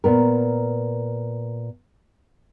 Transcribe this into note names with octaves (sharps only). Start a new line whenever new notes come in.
A#2 B3 A#4